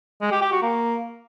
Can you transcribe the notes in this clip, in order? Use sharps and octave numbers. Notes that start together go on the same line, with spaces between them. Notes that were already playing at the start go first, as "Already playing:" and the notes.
G#3
G4
G4
F#4
A#3